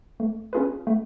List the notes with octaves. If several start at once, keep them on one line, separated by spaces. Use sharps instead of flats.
A3
C#4 F4 G#4 B4
A3